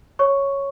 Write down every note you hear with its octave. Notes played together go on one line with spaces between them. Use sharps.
C#5 C#6